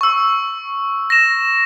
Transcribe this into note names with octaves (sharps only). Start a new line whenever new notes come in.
C#6 E6
A#6 E7